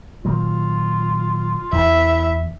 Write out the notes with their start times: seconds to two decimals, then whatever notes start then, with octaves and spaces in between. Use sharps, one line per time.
0.25 A#2 D#3 F#3 F4
1.73 E2 E4 E5